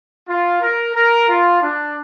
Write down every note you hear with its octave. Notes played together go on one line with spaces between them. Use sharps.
F4
A#4
A#4
F4
D4